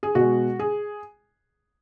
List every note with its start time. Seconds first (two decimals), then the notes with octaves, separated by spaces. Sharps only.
0.03 G#4
0.15 B2 G#3 F#4
0.59 G#4